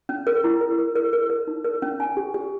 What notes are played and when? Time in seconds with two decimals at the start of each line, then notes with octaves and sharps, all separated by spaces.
0.09 C#4
0.27 A#4
0.44 E4
0.61 A#4
0.79 A#4
0.96 A#4
1.13 A#4
1.30 A#4
1.47 D#4
1.64 A#4
1.82 C#4
2.00 G#5
2.17 G4
2.34 G4